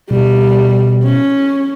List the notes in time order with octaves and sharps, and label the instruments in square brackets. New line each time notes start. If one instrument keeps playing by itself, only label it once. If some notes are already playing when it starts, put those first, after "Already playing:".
[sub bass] B2 [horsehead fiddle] G3
[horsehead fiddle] C#4